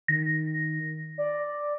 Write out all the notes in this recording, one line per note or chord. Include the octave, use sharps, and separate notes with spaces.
D#3 A#6
D5